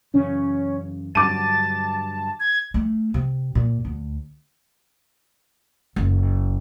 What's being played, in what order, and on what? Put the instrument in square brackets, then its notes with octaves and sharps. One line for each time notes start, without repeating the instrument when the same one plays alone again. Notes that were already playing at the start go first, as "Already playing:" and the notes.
[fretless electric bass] F#2 C#3 E3 [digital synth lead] C#4
[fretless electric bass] G2 D3 F#3 [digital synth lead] A5 [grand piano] D6 D#7 [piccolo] A6
[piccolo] G#6
[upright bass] A3
C3
A#2
D2
F#1